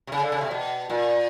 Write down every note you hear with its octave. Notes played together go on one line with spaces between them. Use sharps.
C3
C#3
D3
C#3
C3
B2
A#2